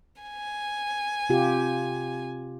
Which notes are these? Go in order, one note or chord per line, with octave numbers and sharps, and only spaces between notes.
G#5
C3 F4 G4